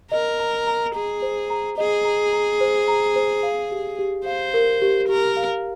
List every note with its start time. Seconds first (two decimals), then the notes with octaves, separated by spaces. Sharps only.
0.12 A#4 D#5
0.40 A#5
0.67 A#5
0.95 G#4 A#5
1.22 C5
1.50 A#5
1.78 G#4 D#5
2.05 A#5
2.32 A#5
2.61 C5
2.88 A#5
3.16 C5
3.43 F5
3.71 G4
3.99 G4
4.26 C5 F5
4.54 A#4
4.82 G4
5.09 G4 A#4
5.37 F5